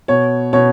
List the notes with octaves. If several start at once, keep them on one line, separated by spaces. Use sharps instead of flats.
B2 C#5
B2 C#5